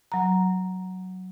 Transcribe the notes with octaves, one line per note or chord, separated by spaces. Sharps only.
F#3 A#5